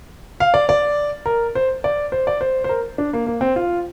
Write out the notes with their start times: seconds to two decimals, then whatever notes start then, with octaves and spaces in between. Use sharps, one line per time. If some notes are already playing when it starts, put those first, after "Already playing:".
0.40 F5
0.54 D5
0.69 D5
1.26 A#4
1.55 C5
1.84 D5
2.12 C5
2.27 D5
2.41 C5
2.64 C5
2.69 A#4
2.98 D4
3.13 A#3
3.27 A#3
3.41 C4
3.56 F4